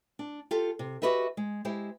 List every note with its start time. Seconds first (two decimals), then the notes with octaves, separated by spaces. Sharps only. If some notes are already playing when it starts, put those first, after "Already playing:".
0.19 D4
0.51 F4 G4 A4
0.79 C3
1.02 F#4 G4 B4 D#5 E5
1.37 G#3
1.65 G#3 E4 G4 C5